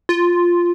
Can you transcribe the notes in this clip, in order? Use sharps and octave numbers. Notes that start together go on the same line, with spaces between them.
F4